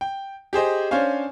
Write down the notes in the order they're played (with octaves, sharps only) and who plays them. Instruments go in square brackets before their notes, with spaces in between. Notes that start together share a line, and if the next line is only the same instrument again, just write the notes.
[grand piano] G5
G4 G#4 C5 D#5
C#4 D4 C5 C#5 F5 G#5